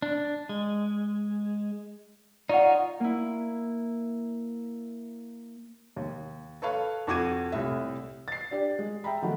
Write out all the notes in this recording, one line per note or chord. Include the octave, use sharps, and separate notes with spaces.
D4
G#3
D#4 F4 C#5 D5 F#5
A#3 E4
D#2
A4 B4 C#5 F5
F2 F#4 D6 G#6 D#7
C2 A2 E5
A6 C7
D4 G4 D5
G#3
E5 G5 A#5 B5
D#3 F3 F#3 A3 F#4